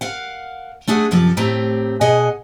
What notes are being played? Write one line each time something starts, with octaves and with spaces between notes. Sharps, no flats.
A#4 F5 F#5
A3 D4 G#4 F#5
F#2 C3 F3 A4
A2 A3 C4 G4 A#5
B2 G#4 D#5 F#5